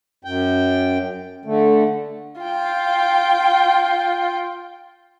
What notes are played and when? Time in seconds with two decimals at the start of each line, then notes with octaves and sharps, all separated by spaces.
0.24 F#2 G5
1.45 D3 A3
2.41 F4 G5